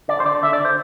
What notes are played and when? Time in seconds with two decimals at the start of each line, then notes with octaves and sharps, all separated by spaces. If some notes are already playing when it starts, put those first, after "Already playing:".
0.08 D3 D5
0.20 C5
0.25 D3 D5
0.43 D3 E5
0.53 D5
0.60 D3 C5